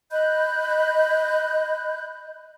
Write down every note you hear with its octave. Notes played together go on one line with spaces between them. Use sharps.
D#5 B5 F#6 G6